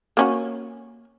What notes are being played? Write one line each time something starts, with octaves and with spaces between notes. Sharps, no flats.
A#3 C#4 F#4